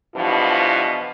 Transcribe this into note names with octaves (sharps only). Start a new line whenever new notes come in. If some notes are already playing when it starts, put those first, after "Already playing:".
G2 B2 E3 F3